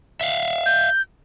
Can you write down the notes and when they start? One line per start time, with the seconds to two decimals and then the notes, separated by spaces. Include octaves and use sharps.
0.21 E5 F5
0.66 G6